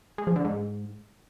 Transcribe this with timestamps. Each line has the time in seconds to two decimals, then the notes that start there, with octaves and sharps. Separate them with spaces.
0.18 G#3
0.27 F3
0.36 D3
0.44 G#2